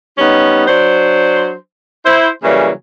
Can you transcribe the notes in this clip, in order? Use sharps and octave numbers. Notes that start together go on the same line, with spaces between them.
G3 B3 C#4 D#4
F#3 D4 C5
E4 C5
C#3 E3 F#3 G3 A#3